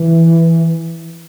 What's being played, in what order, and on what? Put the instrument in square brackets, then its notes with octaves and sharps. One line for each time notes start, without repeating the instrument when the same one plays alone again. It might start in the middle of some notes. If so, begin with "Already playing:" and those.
Already playing: [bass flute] E3